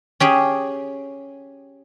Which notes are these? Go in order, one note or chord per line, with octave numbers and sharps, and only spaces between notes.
C#4 G4 G#4